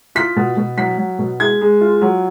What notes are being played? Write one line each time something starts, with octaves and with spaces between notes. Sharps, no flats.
F4 B6
B2
B2
F#3 B6
F#3
B2
G#3 G#6
G#3
F4
F#3